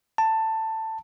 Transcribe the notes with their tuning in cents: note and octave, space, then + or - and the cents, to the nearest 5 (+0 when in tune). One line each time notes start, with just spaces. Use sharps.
A5 +15